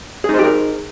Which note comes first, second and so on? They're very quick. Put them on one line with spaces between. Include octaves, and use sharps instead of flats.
G#4 D#4 C5 G4 A#4